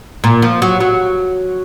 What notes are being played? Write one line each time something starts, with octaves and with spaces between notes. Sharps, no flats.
A#2
F3
F#3
F#3